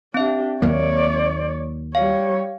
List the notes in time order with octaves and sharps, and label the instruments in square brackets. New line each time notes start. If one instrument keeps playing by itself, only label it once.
[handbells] C4 E5 [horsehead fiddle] D4 G4
[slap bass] D#2 F#3 A#3 [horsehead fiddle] C#5 D5
[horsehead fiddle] G3 C#5 [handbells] F5